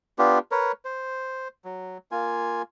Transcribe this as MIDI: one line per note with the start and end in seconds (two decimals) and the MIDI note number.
0.19 0.39 59
0.19 0.39 62
0.19 0.39 65
0.19 0.39 67
0.51 0.72 70
0.51 0.72 71
0.51 0.72 73
0.85 1.48 72
1.65 1.98 54
2.11 2.62 58
2.11 2.62 65
2.11 2.62 80